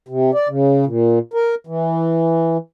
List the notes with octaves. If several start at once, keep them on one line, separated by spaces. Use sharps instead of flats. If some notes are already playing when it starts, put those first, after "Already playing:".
C3
D5
C#3
A#2
A#4
E3